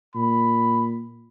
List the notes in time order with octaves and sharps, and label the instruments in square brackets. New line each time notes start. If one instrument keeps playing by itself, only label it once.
[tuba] A#2 [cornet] B5